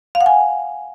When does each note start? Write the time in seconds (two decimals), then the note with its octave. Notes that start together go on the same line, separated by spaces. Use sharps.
0.15 F5
0.21 F#5
0.26 G#5